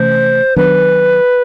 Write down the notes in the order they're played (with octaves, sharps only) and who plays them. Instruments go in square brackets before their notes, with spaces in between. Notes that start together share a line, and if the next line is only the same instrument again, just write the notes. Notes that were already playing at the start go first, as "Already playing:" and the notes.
Already playing: [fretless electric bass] C3 E3 A3 C#4 [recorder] C5
[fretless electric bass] D#3 F#3 B3 D4 [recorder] B4